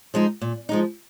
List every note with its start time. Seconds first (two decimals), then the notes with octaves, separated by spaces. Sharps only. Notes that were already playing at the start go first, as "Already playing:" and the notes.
0.14 F3 G#3 D#4
0.41 A#2
0.69 F3 G#3 D#4